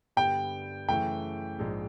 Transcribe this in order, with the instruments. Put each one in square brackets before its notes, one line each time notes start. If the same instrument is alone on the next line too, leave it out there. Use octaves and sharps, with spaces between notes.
[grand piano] G2 D3 G3 B3 [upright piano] G5
[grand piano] F#2 C#3 E3 A3 [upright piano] G5
[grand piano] A#1 G#2 F3 G#3